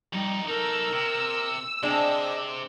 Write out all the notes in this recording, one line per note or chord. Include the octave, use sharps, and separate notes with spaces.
F2 G3 D#4
D#4 A4 A#4 E6
C3
C3 G#3 C4 D4 D#5